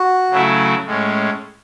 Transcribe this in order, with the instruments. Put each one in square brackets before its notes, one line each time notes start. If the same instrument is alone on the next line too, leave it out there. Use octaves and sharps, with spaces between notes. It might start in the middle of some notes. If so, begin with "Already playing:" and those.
Already playing: [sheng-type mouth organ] F#4
[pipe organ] C#3 F#3 A3 E4
A2 G#3 C#4